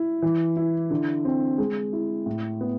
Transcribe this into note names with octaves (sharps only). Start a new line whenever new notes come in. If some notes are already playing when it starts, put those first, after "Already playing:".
Already playing: E4
E3
E4
D3
C4
G#3
E4
A2
B3